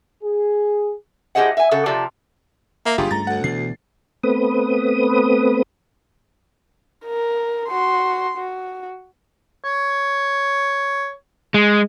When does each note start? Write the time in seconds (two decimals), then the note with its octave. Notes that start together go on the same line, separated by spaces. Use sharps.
0.23 G#4
1.35 A2 G4 G#4 C5 D#5 F#5
1.57 E5 G#5
1.71 C#3 F#4 A4
1.86 C3 F3 G4 D5 A5
2.86 A#3 E5 A#5
2.98 F#1 G2 F4 G4 G#4
3.11 C#2 G2 A3 A#5 A6
3.27 D2 F#5
3.44 B2 E3 C7
4.23 A3 B3 C4 B4 D#6
7.06 A#4
7.69 F#4 C6
8.38 F#4
9.64 C#5
11.54 G#3